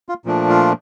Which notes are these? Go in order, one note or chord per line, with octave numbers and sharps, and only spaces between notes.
F4
A#2 F3 A3 D4
F4